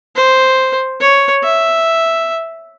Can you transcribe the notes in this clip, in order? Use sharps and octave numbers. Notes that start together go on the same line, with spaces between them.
C5
C#5
E5